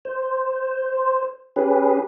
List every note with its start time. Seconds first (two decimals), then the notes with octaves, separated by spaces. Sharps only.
0.05 C5
1.56 C#4 G4 G#4 B4